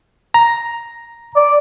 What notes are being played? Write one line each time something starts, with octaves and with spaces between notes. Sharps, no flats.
A#5
D5